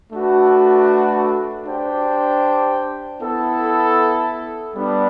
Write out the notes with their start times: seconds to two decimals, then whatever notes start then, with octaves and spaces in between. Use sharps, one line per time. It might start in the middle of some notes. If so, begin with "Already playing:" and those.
0.11 A3 D4 F#4 B4
1.66 D4 G4 C5 G5
3.20 B3 E4 A4
4.75 G3 B3 D4